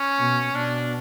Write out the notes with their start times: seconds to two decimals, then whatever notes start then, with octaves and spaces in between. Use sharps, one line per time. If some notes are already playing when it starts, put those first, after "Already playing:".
Already playing: C#4
0.18 B2
0.55 B2 D4